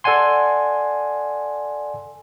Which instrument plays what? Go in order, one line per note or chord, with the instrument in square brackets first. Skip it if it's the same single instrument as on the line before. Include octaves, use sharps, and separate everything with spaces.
[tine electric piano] A4 D5 F#5 G#5 C6